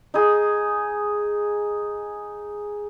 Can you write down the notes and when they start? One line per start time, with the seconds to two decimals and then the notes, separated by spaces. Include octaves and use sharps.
0.14 D#4 G#4